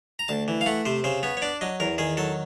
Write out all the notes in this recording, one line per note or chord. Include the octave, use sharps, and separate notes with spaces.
A#5
D2 A5
E3
F5
A3 F#5
C3 C5
C#3 C5
B3 C#5
C#5
D4 D5
F#3 D#5
E2 A#4
D#3 G#4
F#3 A4